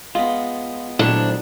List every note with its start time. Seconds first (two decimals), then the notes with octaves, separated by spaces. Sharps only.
0.15 G#3 B3 F4
0.99 A#2 D#3 F3 F#3 A3 D4 E4